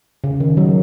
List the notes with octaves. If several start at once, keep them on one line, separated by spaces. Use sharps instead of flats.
C#3
D#3
F#3